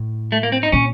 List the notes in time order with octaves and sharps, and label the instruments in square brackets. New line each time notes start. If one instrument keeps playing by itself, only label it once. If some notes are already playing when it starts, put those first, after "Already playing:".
Already playing: [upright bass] A2
[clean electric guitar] A3
A#3
C4
D#4
[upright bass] A#2 [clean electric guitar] C#4